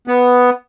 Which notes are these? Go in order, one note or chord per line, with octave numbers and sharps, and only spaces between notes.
B3